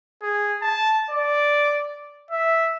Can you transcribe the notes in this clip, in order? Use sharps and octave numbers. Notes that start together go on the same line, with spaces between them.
G#4
A5
D5
E5